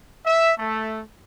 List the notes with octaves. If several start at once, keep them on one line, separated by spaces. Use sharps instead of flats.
E5
A3